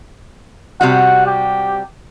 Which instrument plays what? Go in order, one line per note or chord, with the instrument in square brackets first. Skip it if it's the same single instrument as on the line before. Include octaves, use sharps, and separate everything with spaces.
[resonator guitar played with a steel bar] C3 G3 F#4 [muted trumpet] F#5
[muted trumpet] G4